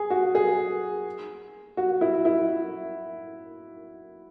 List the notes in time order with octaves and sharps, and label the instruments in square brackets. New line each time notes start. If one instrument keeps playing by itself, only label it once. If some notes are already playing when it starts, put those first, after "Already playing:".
Already playing: [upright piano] G#4
F#4
G#4
F#4
E4
E4